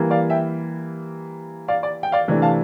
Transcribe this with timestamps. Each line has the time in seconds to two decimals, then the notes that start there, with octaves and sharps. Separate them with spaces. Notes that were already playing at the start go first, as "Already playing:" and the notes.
Already playing: E3 G3 A#3
0.11 D5 F5
0.30 E5 G5
1.68 D5 F5
1.83 D5
2.03 G5
2.12 D5 F5
2.28 C3 E3 A3 D4
2.42 F5 A5